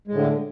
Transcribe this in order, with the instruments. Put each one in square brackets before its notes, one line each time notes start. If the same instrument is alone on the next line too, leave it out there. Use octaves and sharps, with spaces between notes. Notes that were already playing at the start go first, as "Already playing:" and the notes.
[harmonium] G#3
A2
D3